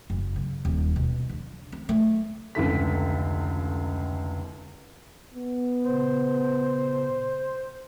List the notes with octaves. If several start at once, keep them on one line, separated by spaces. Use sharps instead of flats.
F#1
C#3
D#1
B2
D3
C4
A3
F1 C#2 D3 E4 A4 B6
B3
A#2 C#3 C5